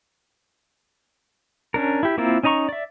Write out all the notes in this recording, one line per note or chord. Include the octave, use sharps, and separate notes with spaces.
C#4 D4 A#4
E4 G4
A#3 C4 E4 F4 A#4
C#4 D#4 D#5 A#5 C#6
D5 E5